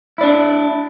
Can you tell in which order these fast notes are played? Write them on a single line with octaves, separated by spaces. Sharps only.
E4 D5 D4